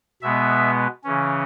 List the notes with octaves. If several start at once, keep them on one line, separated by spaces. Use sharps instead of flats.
B2 G#3 B3 E5
C#3 E3 C#4